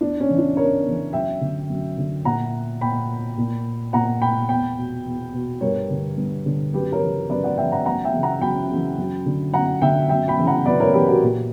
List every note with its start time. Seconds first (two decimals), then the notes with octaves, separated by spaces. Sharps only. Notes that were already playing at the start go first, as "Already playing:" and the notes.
0.01 E2 D4
0.20 C#4
0.29 C#3 E3
0.38 D4
0.57 E2 A#4 C#5
0.85 C#3 E3
1.13 F#2 E5 G5
1.41 D3
1.70 F#2
1.98 D3
2.25 A#2 F#5 A#5
2.81 A#2 G5 B5
3.37 A#2
3.93 A#2 F#5 A#5
4.22 G5 B5
4.49 E2 G5 B5
4.77 B2
5.05 E2
5.33 B2
5.61 G2 A#4 C#5
5.90 D3
6.17 G2
6.46 D3
6.74 F#2 G4 B4
6.92 A#4 C#5
7.01 C#3 E3
7.30 F#2 B4 D5
7.44 D5 F#5
7.57 C#3 E3 E5 G5
7.72 F#5 A#5
7.86 F#2 F#5 A#5
8.04 E5 G5
8.14 C#3 E3
8.23 F#5 A#5
8.41 F#2 G5 B5
8.70 C#3 E3
8.98 F#2
9.26 D3
9.53 F#2 F#5 A#5
9.82 D3 E5 G5
10.09 F#2 E5 G5
10.28 G5 B5
10.38 C#3 E3
10.47 F#5 A#5
10.66 F#2 B4 D5
10.80 A#4 C#5
10.94 C#3 E3 G4 B4
11.08 F#4 A#4
11.22 A#2